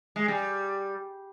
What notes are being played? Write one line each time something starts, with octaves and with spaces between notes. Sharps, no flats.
G#3
G3